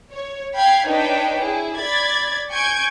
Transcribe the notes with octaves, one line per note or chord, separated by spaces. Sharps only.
C#5
F5 G5 B5 G#6 C7
D4 D#4 B4 C#5 G5
E4 G#4
D5 B5 G#6 A6
G#5 C#6 G6 G#6 D7